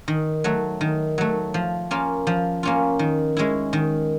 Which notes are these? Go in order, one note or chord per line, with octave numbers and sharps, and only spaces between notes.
D#3
F#3 A3
D#3
F#3 A3
F3
A#3 C#4 F4
F3
A#3 C#4 F4
D#3
G#3 C#4 E4
D#3